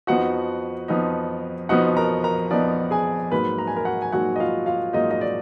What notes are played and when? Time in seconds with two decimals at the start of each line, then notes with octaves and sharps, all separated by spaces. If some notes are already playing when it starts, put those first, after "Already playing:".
0.07 F2 F3 B3 D#4 F#4 F#5
0.88 F2 F3 B3 D#4
1.69 F2 F3 B3 D#4 F#4 F#5
1.97 A#4 A#5
2.23 A#4 A#5
2.51 F2 F3 B3 D#4 D5
2.91 G#4 G#5
3.32 G#2 F#3 A#3 B4 B5
3.58 A#5
3.67 G#5
3.76 A#4 A#5
3.85 F#4 F#5
4.02 G#5
4.12 G#2 F#3 A#3 F#4 F#5
4.36 D#5
4.40 F4 F5
4.66 F4 F5
4.93 G#2 F#3 A#3 D#4 D#5
5.11 D#5
5.21 D5